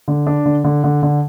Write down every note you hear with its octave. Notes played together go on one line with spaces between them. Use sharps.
D3
D4
D3
D3
D3
D3